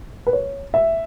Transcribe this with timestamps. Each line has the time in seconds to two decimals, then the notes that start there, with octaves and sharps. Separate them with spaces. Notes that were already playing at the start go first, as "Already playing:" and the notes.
0.27 B4
0.33 C#5
0.74 E5